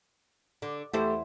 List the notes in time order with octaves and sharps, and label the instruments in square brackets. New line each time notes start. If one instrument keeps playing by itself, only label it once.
[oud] D3
[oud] E2 E4 C5 [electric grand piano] A3 G4 A4